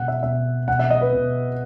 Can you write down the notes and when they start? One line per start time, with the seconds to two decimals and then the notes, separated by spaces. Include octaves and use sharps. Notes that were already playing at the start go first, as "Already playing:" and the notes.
Already playing: B2 F#5
0.08 E5
0.23 B2 E5
0.68 B2 F#5
0.79 E5
0.90 D#5
1.01 B4
1.13 B2